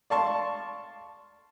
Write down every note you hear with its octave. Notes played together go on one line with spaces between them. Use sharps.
D5 F5 A5 C6 C#6